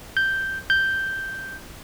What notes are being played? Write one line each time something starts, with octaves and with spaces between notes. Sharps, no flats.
G6
G6